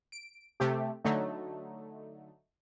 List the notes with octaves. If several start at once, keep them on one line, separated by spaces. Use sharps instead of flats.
D7
C3 A3 G4
D3 F#3 A3 D#4